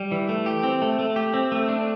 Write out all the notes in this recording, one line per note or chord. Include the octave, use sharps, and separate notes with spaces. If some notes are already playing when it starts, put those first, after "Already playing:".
Already playing: G3
E3
A3
G4
C4
A3
A3
G4
C4
A3
D4